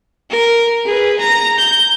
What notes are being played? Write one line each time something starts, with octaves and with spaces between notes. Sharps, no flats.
A#4
G#4 B4
A#5 A#6
G6